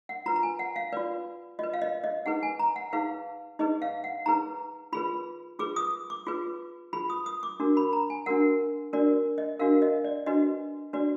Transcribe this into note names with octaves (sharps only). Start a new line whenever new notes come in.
F#5
F4 B4 A#5
A#5
G#5
F#5
F5
F4 B4 D5
F4 B4 D#5
F5
D#5
D#5
D#4 G#4 B4 F#5
G#5
A#5
F#5
D#4 G#4 B4 F5
D#4 G#4 B4 D#5
F5
F#5
D#4 G#4 B4 A#5
F4 G#4 B4 B5
F4 G#4 B4 D6
D#6
D6
F4 G#4 B4
F4 G#4 B4 B5
D#6
D#6
D6
D4 F#4 A#4
B5
A#5
G#5
D4 F#4 A#4 F#5
D4 F#4 A#4 D5
D#5
D4 F#4 A#4 F5
D#5
D5
D4 F#4 B4 D#5
D4 F#4 B4 D5